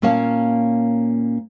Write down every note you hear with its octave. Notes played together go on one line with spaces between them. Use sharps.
A#2 A#3 C#4 C#5 F5 A5